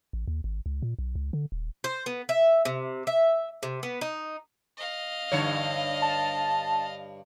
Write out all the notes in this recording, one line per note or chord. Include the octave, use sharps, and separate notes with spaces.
A1
D#2
G#1
C#2
A#2
B1
C#2
D3
D#1
C5
B3
E5
C3
E5
C3
B3
D#4
D#5 F5
G2 D3 C#5
A5